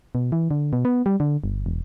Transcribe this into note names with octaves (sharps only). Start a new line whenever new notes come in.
B2
E3
D3
B2
B3
G3
D3
G1
E1